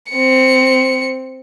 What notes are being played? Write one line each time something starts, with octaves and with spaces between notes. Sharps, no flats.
C4 C#7